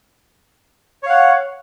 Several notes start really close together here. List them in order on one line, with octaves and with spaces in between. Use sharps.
C#5 F5 F#5